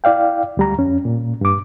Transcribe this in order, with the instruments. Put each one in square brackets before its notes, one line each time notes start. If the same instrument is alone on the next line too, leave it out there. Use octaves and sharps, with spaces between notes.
[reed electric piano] E4 D5 F5 G5
D2 G3 A#5
F2 C#4
A#2
G2 D6